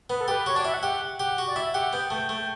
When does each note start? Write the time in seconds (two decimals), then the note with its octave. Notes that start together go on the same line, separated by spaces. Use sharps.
0.10 B3 B4
0.21 A4
0.28 G4 B4
0.46 F#4 C#5
0.55 D4 D5
0.65 E4 E5
0.74 F#5
0.83 G4
1.20 G4
1.38 F#4
1.47 D5
1.56 E4 E5
1.74 G4 F#5
1.93 B3 G5
2.10 A3 G5
2.29 A3